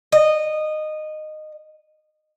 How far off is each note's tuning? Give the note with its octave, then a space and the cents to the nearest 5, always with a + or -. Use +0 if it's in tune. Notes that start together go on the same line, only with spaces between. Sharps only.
D#5 -15